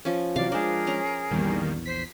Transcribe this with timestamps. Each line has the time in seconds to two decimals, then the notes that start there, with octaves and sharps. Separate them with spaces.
0.05 F3 C#4
0.36 C3 E3 F#3 D5 F5
0.52 F3 G#3 D4 G#4 A#4 C5
0.87 C#4 A#5
1.31 A#1 E2 D#3 G3 A#3
1.86 C5 B6 C7